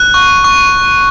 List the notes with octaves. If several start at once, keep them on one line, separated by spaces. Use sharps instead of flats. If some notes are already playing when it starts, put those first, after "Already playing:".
Already playing: F#6
C#6
C#6